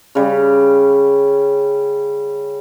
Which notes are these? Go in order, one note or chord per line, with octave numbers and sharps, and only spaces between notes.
C#3 G3